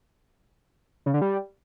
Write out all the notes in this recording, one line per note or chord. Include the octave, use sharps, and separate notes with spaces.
C#3
D3
G3